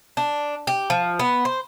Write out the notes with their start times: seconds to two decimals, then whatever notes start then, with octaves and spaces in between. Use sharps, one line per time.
0.17 D4
0.67 G4
0.90 F3
1.19 B3
1.45 C5